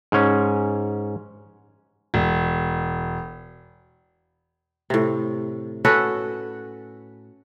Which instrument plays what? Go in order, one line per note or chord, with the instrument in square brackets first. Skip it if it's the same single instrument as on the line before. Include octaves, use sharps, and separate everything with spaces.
[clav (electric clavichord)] G#2 C#4
[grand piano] E1
[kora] A2 C3
C#4 F#4 A4 B4